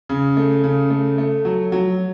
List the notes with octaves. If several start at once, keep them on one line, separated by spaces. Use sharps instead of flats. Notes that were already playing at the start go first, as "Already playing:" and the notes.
C#3
A3
C#3
A3
A3
F#3
F#3